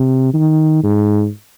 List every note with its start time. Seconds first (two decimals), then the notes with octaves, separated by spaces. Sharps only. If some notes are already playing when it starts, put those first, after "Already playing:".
Already playing: C3
0.33 D#3
0.83 G#2